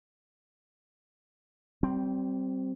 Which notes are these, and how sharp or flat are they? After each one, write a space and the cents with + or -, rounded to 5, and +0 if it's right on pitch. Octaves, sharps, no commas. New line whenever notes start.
G3 -25 C4 +0